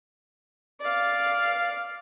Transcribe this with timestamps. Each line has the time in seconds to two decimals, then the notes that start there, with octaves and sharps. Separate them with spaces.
0.81 D5 F5